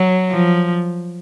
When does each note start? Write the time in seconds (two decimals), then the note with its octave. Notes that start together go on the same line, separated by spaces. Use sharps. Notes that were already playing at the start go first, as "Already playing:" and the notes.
Already playing: F#3
0.31 F3